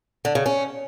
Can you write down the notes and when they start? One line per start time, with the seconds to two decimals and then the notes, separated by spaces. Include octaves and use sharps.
0.25 D3
0.35 C#3
0.46 C#4